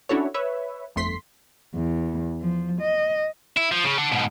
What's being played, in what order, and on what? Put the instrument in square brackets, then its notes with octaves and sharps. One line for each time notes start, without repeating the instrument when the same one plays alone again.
[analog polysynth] C#4 D4 E4 F#4 A4 C#5
B4 C#5 E5
G1 F2 A3 C6 B6 C7
[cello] E2
F3
D#5
[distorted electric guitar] E4
F3
C#3
A4 F#5
G#2 B2